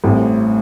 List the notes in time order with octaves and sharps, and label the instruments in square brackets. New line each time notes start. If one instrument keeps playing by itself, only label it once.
[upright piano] A1 A2 E3 G3 C4